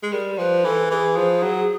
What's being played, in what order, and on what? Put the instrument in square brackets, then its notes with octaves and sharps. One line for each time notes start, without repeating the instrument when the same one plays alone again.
[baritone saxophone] G#3
[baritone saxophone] G3 [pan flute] A#4
[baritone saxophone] F3 [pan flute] B4
[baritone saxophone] E3 [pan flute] A4
[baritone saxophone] E3 [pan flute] G#4
[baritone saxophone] F3
F#3